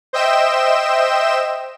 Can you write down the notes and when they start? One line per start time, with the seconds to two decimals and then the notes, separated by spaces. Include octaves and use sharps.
0.13 C5 D#5 E5 G5 E7